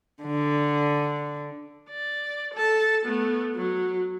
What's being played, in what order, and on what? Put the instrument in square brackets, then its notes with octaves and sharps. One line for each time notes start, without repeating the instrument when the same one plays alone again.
[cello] D3
[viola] D5
A4 A5
A3 B3
F#3 F#4